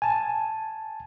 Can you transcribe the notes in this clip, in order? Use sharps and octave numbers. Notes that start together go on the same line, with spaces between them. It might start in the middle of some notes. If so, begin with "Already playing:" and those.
G#5 A5